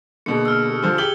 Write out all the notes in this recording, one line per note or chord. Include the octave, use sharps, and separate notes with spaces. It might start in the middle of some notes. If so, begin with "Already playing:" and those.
B2 D3 A#3 G#4 C#7
E6 F6
G4 A4
D3 F3 G#5
G4 G#4 E6 F#7 G7